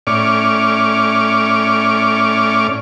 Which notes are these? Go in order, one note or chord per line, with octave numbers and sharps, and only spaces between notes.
A2 C#4 D5 C#6 D6 F6